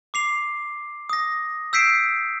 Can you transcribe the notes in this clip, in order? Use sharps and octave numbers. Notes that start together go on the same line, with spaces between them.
D6 C7 F7
D#6 A#6
E6 G6 B6 C7 D7 E7